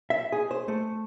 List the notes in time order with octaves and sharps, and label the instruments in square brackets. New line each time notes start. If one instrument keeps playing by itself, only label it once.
[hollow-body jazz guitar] E5
G#4
C5
A3